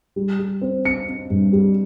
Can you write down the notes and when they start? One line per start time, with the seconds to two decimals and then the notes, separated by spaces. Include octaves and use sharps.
0.16 G3
0.39 G3
0.61 C4
0.85 C4 C#7
1.08 C4
1.30 G2
1.53 G3